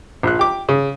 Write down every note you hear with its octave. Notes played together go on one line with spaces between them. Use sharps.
A#1 F#6
G4 D6
C#3